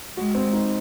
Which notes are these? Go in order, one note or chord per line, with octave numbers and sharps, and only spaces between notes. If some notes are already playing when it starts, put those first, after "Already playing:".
G#3 F#4
C4
D#4